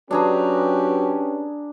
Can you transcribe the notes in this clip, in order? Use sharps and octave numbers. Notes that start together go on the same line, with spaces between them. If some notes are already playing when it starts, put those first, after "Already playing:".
F#3 C#4 D4 G4 G#4 B4 A#5